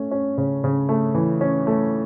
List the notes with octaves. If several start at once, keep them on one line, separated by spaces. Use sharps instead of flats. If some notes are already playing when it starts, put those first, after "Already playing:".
Already playing: A3 C#4
C#4
C#3
C#3
A3
E3
C#4
A3